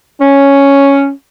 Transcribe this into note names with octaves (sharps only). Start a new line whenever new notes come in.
C#4